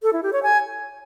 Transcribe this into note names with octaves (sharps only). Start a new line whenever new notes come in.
A4
E4
G4
C#5
G#5